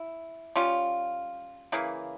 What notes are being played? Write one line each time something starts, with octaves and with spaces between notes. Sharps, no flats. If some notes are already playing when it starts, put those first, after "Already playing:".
Already playing: E4
G3 C#4 F4
C#3 E3 A#3